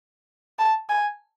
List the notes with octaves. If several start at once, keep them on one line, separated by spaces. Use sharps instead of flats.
A5
G#5